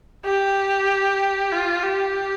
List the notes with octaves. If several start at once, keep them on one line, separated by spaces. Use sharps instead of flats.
G4
F4
G4